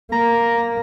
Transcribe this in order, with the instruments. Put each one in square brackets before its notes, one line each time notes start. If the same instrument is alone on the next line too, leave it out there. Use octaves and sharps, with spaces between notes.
[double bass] A#3 [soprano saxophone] A#5